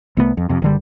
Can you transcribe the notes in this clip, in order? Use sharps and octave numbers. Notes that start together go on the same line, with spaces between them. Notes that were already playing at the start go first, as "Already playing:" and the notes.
C2 A3 B3
F2
F2 C3
F#1 D3 G3